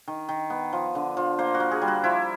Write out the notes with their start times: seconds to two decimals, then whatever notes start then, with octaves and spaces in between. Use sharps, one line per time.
0.08 D#3
0.29 D#3
0.50 B3
0.73 F3
0.95 D3
1.17 F3
1.39 A#3 C5
1.54 F#4
1.60 A#3
1.71 G#4
1.82 G3
1.88 F#4
2.04 F3 E4